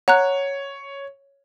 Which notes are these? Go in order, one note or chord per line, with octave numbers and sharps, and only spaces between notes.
C#5 F#5 A#5 F#6